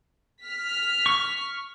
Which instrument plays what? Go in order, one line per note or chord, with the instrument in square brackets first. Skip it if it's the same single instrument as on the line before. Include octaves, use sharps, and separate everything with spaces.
[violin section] F6 B6
[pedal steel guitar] C#6